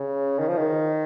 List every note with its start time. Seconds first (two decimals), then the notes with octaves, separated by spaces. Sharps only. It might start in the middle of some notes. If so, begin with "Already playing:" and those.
Already playing: C#3
0.39 D#3
0.48 F3
0.57 D#3